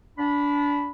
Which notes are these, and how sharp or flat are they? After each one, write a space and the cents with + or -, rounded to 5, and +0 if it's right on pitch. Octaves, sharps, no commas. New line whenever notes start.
D4 -25 B5 +0